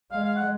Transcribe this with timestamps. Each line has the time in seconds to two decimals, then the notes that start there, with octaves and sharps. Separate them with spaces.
0.12 G#3 F5
0.23 F5
0.36 F#5